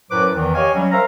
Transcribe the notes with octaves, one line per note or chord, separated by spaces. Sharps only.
F#2 A2 F#3 B4 C5 D6
E2 D#3 E3
G4 C#5 D#5 F5 G#5
F#3 G3 C#4
A#4 C5 E5 F5 A#5